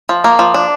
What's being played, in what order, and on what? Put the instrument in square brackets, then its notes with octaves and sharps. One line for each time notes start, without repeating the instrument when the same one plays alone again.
[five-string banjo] F3
A#3
F3
D4